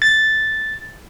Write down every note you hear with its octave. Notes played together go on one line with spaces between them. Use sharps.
A6